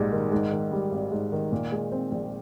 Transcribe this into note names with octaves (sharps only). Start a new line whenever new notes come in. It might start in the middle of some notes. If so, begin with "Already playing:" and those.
Already playing: A#1 G#2 G3
D#3
G#2
D#3
G3
G#1
G#2
D#3
A#2
G#3
C4
A#1